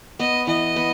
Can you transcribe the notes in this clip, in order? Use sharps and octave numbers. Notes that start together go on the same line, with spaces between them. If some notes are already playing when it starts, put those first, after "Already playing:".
B3 D#5
E3 D#5
B3